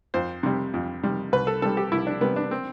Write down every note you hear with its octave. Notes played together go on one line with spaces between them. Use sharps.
F2 C5
C3 G3
F2
C3 G3
C2 B4
A4
C3 G3 A4
G4
C2 E4
D4
C3 G3 B3
D4
C4